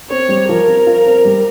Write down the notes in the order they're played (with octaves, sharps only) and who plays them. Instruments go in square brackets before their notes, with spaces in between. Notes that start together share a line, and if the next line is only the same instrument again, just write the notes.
[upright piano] C4 [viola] C#5
[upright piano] G3
[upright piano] F3 [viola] A#4
[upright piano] C4
F4
C4
G3